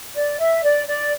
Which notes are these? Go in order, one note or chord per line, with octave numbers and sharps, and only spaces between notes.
D5
E5
D5
D5